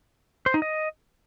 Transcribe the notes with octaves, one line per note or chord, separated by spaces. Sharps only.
C5
D#4
D#5